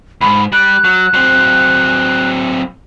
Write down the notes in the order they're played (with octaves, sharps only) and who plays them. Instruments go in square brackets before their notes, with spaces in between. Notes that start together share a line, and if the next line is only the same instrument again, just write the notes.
[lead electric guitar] C#2 G#2 [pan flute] B5
[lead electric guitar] G3 [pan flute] F#6
[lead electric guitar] F#3
F#3 C4